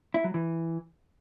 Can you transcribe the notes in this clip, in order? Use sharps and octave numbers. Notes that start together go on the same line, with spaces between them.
E4
F#3
E3